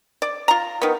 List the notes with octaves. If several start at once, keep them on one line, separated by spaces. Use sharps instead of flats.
D5
F4 A#5
D#3 B3